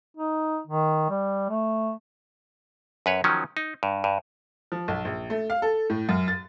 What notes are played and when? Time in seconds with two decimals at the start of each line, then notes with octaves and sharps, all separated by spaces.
0.17 D#4
0.67 D#3
1.10 G3
1.50 A3
3.06 F#2 B4 C#5
3.24 D#3 F3 F#3 C#4
3.57 D#4
3.83 G2
4.04 G2
4.72 F3
4.88 B1
5.05 A#1
5.30 A3
5.50 F5
5.62 A4
5.90 A2
6.09 F#2
6.28 A6